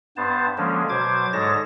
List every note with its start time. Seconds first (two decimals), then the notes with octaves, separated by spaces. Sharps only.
0.17 G2 B3 C5 A5
0.58 D3 F3 G#3 A#3 C#4
0.89 B2 F#3 C5 D6 G#6
1.33 G#2 D3 G#3 C#5 A5 A#6